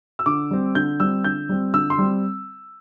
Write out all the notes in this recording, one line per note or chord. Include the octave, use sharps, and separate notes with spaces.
E6
D3 D6
G3 C4
D3 G6
G3 C4 E6
D3 G6
G3 C4
D3 E6
C6
G3 C4